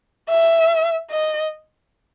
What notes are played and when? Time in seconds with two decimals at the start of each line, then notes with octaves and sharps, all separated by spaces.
0.29 E5
1.10 D#5